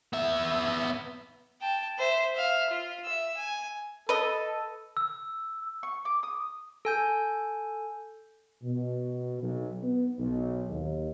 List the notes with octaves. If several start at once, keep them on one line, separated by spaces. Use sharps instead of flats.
B3 E5
G5 A5
C5 E5
E5 F5
F4
E5 E6
G#5
A4 B4 D#5
E6
C#6
D6
D#6
A4 G#5 G6
B2
B1
B3
B1
D#2